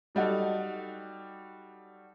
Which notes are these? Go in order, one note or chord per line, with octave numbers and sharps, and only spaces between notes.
F#3 G3 D#4 F#4 A4